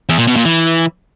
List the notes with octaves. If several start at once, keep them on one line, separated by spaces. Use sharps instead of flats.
E2
A#2
B2
A#2
E3